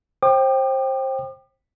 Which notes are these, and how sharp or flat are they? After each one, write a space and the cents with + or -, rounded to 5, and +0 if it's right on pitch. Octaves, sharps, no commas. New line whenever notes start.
C5 +25 G5 +0 D6 +45